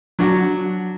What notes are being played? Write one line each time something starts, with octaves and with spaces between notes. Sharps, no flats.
F#3 D4 F#4